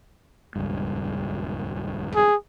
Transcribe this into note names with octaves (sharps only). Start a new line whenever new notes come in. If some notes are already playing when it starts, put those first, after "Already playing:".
D#1 C#2 G2
G#4